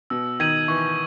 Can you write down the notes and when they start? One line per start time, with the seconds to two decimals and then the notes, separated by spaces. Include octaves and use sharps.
0.10 B2 E6
0.40 D#3 G#6 D#7 F#7
0.68 E3 C#6